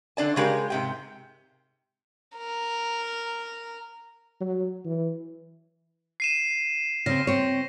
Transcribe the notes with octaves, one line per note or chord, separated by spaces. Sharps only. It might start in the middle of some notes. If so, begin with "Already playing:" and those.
D3 D4 D5 A5
C#3 G#3 G4 A#4
G#2 C3 G5
A#4
F#3
E3
C7 D#7 E7
C#3 C4 A#6
C4 C#5